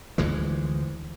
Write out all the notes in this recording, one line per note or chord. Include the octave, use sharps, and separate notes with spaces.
D2 E3 F3 G#3